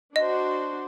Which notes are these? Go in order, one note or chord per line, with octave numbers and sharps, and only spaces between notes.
D4 F#4 C5 D#5